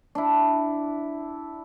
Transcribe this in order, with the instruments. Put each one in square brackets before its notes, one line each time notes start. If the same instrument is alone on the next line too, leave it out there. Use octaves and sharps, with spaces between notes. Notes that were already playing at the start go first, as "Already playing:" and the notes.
[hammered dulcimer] D4 E4